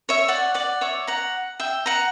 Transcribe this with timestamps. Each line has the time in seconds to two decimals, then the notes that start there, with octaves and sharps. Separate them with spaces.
0.09 C#5 E5
0.28 D5 F#5
0.54 D5 F#5
0.81 C#5 E5
1.07 F#5 A#5
1.60 E5 G5
1.86 F#5 A#5